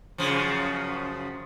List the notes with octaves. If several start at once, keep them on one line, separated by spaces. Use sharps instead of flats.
F#2 C#3 F3